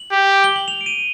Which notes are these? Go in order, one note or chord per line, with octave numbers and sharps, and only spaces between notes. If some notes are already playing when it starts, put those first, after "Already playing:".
Already playing: F#7
G4
G7
F#7
F7
D7
D#7